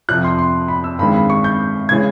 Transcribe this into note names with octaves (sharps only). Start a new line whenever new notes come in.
F2 C3 F3 F#6
C6
C6
B5
E6
G2 D#3 G#3 C4 B5
B5
C#6
G6
C#3 E3 G#3 C#4 G#6